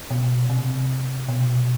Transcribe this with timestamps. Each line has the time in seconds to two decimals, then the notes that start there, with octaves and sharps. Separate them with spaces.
0.10 B2
0.50 C3
1.28 B2